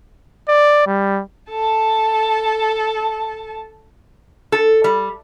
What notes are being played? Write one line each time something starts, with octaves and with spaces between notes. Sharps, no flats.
D5
G3
A4 A5
A4
G3